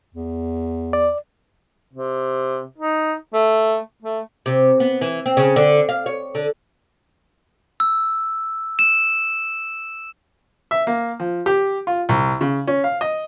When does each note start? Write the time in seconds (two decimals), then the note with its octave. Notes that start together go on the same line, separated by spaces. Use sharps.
0.14 E2
0.93 D5
1.94 C3
2.78 D#4
3.34 A3
4.03 A3
4.46 C3
4.80 B3
5.01 E3
5.26 C4
5.37 C#3
5.56 D3
5.89 F5
6.06 C#5
6.35 D3
7.80 E6
8.79 E7
10.71 E5
10.87 A#3
11.20 F3
11.46 G4
11.87 F4
12.09 C2
12.41 C#3
12.68 C#4
12.84 F5
13.01 D#5